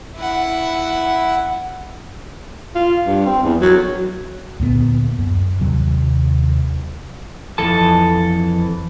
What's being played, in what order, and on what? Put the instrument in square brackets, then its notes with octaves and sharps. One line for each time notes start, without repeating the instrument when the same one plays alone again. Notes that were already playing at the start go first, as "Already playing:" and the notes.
[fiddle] E4 F#5
[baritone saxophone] F4
G2
C4
E2
F#3
[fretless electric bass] D2 A#2 B3
F#2
D#2 C3 F#3
[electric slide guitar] F2 E3 A4 A5